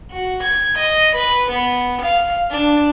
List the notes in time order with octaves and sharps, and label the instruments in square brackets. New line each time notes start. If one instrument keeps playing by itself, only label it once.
[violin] F#4
G#6
D#5
B4
B3
F5
D4